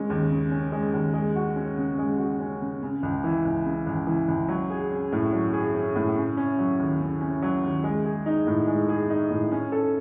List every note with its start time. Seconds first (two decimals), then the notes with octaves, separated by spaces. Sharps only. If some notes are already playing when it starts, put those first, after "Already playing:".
Already playing: C#3 G#3 C#4
0.10 D#2
0.31 C#3
0.51 C#4
0.72 G#3
0.93 D#2
1.14 G#3
1.35 F#4
1.56 C#4
1.77 C#3
1.98 G#3
2.19 F#4
2.40 C#4
2.61 C#3
2.82 C#3
3.03 C#2
3.24 E3
3.45 C#2
3.65 C#3
3.87 C#2
4.07 E3
4.28 C#2
4.48 F#3
4.70 G#4
4.91 C#4
5.12 A2
5.33 F#3
5.53 G#4
5.74 C#4
5.96 A2
6.16 C#3
6.37 C#4
6.59 F#3
6.79 D#2
7.00 C#3
7.21 C#4
7.42 F#3
7.63 D#2
7.84 G#3
8.05 G#4
8.26 D#4
8.47 A2
8.67 G#3
8.89 G#4
9.10 D#4
9.30 A2
9.52 C#4
9.72 A4